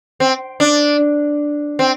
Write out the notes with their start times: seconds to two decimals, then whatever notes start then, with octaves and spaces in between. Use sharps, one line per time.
0.20 C4
0.60 D4
1.79 C4